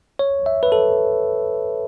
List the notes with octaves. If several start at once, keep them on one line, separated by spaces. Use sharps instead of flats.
C#5
E5
B4
A4